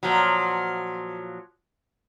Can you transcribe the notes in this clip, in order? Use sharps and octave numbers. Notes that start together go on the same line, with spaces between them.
A#2 F3 F#3